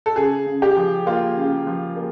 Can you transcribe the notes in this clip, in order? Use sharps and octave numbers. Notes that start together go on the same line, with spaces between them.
A4
C#3 G#4
C#3
G4
F3
A#3 F4
C#3
F3
A#3